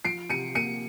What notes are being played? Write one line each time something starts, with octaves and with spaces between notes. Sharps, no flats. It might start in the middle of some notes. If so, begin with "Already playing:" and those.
F3 C7 D7
C3 C#7 D#7
A#3 C#7 D#7